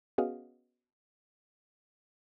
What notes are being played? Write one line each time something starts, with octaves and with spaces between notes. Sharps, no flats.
B3 C#4 F#4 G#4 D#5 F5